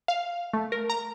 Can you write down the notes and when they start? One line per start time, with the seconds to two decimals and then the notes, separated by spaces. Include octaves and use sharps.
0.08 F5
0.53 A3
0.72 A#4
0.90 A#5